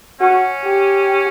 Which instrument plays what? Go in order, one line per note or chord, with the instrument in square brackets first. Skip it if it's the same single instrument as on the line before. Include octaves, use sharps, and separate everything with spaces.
[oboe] C#4 [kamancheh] F#4
[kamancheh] G4